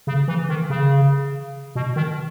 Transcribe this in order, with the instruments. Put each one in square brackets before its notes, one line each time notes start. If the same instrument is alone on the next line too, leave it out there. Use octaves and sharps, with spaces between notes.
[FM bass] C#3
E3
D#3
C#3
B2
D#3